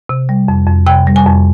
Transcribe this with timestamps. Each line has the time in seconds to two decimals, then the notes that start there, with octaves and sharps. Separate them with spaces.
0.09 C3
0.29 G3
0.48 F2
0.67 F2
0.86 C3 G5
1.07 G3
1.16 G#5
1.26 F2